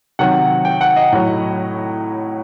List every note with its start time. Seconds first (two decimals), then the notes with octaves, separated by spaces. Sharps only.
0.19 C3 D#3 F#3 F#5
0.65 G5
0.81 F#5
0.96 D#5
1.12 A2 F#3